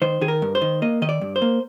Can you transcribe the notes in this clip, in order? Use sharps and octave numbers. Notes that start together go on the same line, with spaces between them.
D#3 C5
D#3 G#4
A#4
G2
C5
D#3
A#3 D#5
D#3 D#5
D5
G2
C5
A#3